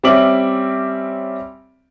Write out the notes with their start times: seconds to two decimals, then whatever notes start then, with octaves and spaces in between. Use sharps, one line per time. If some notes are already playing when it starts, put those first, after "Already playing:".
0.03 G3 C4 C#4 E5 D6 F#7